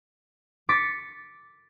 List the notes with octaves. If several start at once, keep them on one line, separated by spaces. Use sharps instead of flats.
D6 A6 B6 C#7 D7